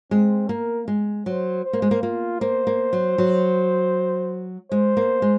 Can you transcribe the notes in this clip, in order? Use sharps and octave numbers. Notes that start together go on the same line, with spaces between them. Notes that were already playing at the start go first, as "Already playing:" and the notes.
G#3 C4
A#3 A#4
G#3
F#3 C5
C5
A#3
G#3
A#3
A#3 F4
A#3 C5
A#3
F#3
F#3
G#3 C5
A#3
G#3